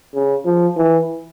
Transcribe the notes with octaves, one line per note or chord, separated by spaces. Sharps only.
C#3
F3
E3